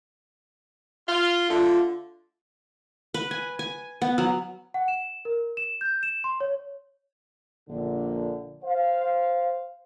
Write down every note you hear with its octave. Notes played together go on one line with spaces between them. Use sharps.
F4
D3 A3 D4 F4
B4
G#5
G#5
B3
F#3
F#5
E7
A#4
E7
G6
E7
C6
C#5
A#1 A#2 D3
C5 F5